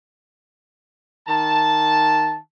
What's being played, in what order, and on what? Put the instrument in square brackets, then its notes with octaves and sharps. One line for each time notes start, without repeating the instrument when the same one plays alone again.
[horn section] D#3 A5